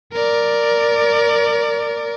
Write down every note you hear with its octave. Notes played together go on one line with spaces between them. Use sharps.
A#4 D5